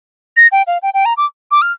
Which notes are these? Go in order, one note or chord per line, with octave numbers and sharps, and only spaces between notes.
A#6
G5
F5
G5
G5
A#5
D6
D6
F6